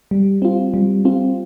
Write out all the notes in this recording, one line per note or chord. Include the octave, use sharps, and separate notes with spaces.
G3
C4 F4
G3
C4 F4